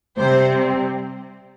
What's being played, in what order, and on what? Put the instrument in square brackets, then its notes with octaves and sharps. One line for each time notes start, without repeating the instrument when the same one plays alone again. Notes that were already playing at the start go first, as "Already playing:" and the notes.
[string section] C3 G3 C4 C5